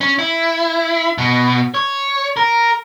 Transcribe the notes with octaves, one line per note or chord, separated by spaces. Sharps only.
C#4
E4
B2
C#5
A#4